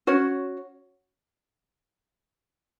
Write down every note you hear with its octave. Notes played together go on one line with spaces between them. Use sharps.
C#4 F#4 C#5